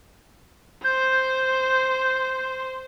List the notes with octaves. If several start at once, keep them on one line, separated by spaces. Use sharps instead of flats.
C5 G6